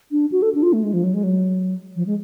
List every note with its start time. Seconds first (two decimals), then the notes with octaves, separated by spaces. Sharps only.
0.11 D4
0.32 F#4
0.42 A4
0.54 D4
0.63 F4
0.73 A3
0.83 G#3
0.93 F3
1.04 F#3
1.14 G#3
1.23 F#3
1.96 F3
2.07 G#3